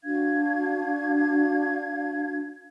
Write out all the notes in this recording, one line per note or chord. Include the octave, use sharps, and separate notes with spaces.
D4 F#4 F5 G#6